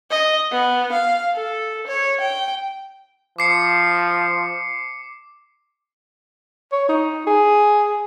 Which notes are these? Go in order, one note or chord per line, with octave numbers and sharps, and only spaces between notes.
D#5
B3
F5
A4
C#5
G5
F3 D6 C7 C#7
C#5
D#4
G#4